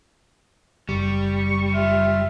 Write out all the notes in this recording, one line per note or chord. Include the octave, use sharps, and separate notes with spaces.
F#1 G3 C#6
F4 E5